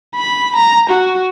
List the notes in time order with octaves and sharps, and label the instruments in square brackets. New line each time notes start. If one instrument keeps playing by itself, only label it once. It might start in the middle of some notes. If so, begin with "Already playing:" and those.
[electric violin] B5
A#5
F#4